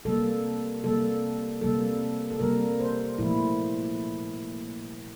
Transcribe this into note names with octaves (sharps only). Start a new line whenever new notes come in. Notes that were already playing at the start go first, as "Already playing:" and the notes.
C3 G3 A#3 A4
C3 G3 A#3 A4
C3 G3 A#3 A4
A4
C3 G3 A#3 A#4
C5
A#2 F3 A3 E4